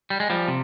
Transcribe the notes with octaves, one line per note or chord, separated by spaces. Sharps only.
G3
G#3
F3 G3
C3